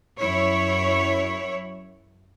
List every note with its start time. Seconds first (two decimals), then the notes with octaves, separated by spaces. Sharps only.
0.20 F#2 E4 C#5